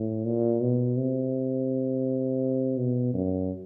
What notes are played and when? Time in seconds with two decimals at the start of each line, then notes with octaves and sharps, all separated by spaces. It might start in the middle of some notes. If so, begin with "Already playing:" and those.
Already playing: A2
0.25 A#2
0.61 B2
0.97 C3
2.78 B2
3.14 F#2